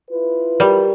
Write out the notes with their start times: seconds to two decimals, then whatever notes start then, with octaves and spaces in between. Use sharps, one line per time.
0.11 E4 F4 B4
0.60 G3 G4 A#4